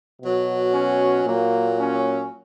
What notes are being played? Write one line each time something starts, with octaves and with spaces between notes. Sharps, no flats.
B2 F#3
C#4
A#2 F#3 A#3
C#4